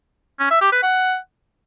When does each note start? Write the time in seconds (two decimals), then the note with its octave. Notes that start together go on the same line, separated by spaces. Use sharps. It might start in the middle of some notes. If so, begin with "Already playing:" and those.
0.40 C#4
0.51 E5
0.61 G4
0.72 B4
0.83 F#5